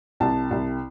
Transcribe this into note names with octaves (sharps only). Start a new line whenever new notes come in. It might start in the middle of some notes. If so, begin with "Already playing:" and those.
C2 A5
C2